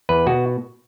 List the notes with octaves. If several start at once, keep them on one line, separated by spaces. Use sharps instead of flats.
E2 B4
B2 F#4